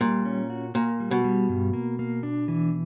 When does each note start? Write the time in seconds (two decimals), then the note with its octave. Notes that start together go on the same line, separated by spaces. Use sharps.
0.01 A#2 G3
0.25 C#4
0.50 F#4
0.75 A#2 A#3
1.00 G3
1.11 B2
1.24 G3
1.49 G2
1.73 A#3
1.99 A#3
2.23 D4
2.48 E3